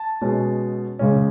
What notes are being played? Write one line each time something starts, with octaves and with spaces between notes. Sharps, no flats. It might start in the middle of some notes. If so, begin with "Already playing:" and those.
Already playing: A5
B2 G#3 C#4
C#2 C#3 G#3 C#4